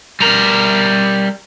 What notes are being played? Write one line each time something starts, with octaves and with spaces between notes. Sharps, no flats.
G3 A#4